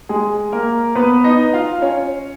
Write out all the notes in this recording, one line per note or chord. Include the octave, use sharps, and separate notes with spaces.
G#3 G#4
A#3 A#4
B3 B4
D#4 D#5
F4 F5
C#4 C#5